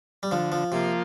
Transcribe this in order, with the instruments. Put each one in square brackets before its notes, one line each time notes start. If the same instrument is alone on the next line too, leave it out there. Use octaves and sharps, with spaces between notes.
[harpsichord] G3
[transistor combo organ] D3 [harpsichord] F3
[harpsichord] F3
[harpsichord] C3 [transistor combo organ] F3 A#3 F4